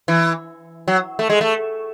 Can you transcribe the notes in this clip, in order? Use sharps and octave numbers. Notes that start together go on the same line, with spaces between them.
E3
F#3
A3
G#3
A3